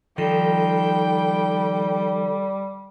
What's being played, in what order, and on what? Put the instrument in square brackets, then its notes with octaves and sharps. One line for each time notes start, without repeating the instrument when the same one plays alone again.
[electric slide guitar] D#3 F3 D#4 [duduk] G3 [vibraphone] A4 [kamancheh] G5